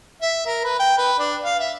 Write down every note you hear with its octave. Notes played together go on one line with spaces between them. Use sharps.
E5
A#4
B4
G5
B4
D4
F5
E5